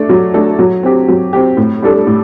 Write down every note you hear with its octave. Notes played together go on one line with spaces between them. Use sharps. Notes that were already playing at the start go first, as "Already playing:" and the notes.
Already playing: A3 D4 A4
F#3
A3 D4 A4
F#3
C4 G4
F#3
C4 G4
A2
G3 D4 A4
A2